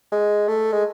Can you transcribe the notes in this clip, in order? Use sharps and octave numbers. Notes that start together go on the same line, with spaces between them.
G#3
A3
G#3